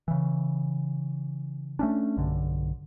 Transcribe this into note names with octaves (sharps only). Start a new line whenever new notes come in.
C#3 E3
A3 C#4 D4
B1 G2 D3